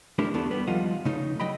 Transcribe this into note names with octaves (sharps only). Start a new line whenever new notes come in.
A3 D4 E4 G4 A#4
E2 E3 A3 B3 D4 A4
G3 B3
D#2 F3 G3 F4 D#5 F#5
C#3 A3 D#4
F#3 D#5 G5 B5